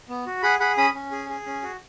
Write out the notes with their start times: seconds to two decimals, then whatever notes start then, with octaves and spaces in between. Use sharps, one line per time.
0.09 B3
0.26 F#4
0.43 G#4 F#5 B5
0.60 G#4 F#5 B5
0.77 C#4 B5 D#6
0.94 C#4
1.12 G#4
1.29 G#4
1.46 C#4
1.63 F#4